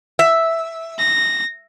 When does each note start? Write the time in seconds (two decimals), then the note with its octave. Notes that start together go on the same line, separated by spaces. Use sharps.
0.19 E5
0.99 A#6